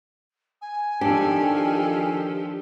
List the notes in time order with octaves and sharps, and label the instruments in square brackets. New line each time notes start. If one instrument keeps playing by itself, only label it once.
[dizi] G#5
[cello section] D#3 F3 A4 [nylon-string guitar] D4 [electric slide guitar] G4